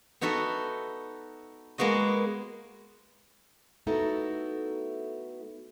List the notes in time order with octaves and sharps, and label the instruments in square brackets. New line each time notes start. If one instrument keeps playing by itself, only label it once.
[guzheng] B3 D#4 F#4 A4 E5
G#3 A#3 B3 F#4 D#5
[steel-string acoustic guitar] A3 B3 D#4 E4 F#4 A4